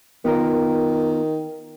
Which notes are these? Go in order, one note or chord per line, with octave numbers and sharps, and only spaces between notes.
D#3 B3 F4 A#4